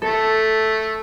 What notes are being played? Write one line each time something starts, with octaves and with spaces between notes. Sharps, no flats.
A3 A4